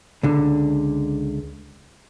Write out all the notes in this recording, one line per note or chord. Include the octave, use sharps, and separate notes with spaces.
C#2 D3